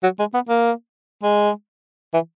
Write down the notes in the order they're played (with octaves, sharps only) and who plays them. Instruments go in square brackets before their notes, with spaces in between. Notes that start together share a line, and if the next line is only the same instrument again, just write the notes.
[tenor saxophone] F#3
G#3
B3
A#3
G#3
E3